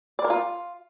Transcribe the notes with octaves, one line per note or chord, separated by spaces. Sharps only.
D5
A#4
F4